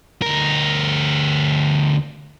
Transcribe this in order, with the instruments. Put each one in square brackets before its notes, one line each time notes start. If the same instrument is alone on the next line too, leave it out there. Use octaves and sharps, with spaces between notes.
[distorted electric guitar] D2 A#4